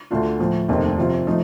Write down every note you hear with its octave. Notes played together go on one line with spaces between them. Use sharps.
D2 D3 A3 D4 F4
A2 F3 A3
F1 D#2 D#3 A3 C4
C3 F3 C4 F4
F3 A3 D#4